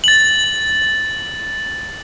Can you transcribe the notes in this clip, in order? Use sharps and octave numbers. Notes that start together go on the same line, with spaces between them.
A6 F#7